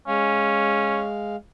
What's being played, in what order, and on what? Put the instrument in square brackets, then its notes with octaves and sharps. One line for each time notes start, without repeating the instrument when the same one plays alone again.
[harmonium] G#3 F5 [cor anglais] C#4